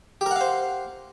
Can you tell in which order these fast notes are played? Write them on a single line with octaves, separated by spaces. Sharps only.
G4 A#4 F#5 F5 C5